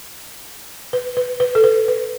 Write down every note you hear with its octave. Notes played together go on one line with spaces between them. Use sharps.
B4
B4
B4
A4
B4
B4